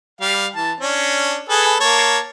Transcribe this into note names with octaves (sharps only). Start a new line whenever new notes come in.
G3 F5
E3 A5
C#4 D4
G#4 A4 B4
A#3 C#5 A5